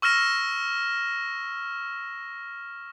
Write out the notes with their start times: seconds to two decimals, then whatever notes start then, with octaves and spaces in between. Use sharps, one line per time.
0.02 C#6 E6 F6 A#6 E7